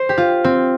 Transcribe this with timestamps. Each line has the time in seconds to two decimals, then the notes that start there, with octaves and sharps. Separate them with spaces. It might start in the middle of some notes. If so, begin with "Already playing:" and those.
Already playing: C5
0.09 G4
0.18 F4
0.44 C4